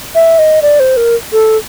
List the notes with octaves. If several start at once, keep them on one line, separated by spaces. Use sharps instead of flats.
E5
D#5
D5
C5
A#4
A4